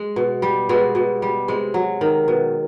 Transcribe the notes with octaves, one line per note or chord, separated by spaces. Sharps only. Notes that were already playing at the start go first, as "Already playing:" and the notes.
Already playing: G#3
B2
G3
B2 G#3
B2
G3
C3 G#3
F#3
D#3
B2